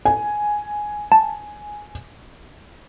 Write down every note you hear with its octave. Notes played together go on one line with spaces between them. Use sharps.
G#5
A5